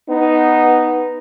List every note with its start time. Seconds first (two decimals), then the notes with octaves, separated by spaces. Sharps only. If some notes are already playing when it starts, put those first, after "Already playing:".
0.09 B3 D#4